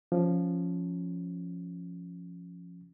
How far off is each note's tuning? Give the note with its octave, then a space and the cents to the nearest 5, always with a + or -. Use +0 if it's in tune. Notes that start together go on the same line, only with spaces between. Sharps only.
F3 +0 C#4 +0